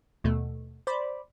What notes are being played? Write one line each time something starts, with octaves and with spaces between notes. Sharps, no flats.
D#2 B2 A3
C5 D5 B5